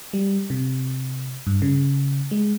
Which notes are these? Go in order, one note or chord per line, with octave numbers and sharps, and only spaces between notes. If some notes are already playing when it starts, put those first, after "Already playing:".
G3
C3
G2
C#3
G#3